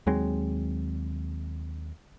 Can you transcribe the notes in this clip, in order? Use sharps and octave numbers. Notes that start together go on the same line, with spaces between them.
D#2 F#3 G#3 C4